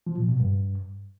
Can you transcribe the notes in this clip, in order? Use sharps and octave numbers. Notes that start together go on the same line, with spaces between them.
F3
A#2
B2
G2